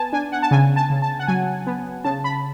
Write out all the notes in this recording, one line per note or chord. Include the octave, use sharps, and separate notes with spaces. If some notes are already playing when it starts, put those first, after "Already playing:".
Already playing: B3 G#5 A5
D4 G#5
F#5
A5
C#3 G#5
A5
C#3
A5
F#5
F#3 G#5
B3
C#3 A5
B5